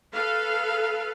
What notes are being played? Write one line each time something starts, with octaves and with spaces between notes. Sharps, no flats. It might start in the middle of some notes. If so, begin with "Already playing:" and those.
A4 B4 F5